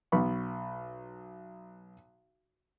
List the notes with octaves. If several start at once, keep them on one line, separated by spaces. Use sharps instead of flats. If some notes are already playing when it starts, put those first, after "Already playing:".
B1 B3 B5 C#6